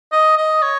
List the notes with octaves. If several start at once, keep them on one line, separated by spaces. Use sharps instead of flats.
D#5
D#5
C#5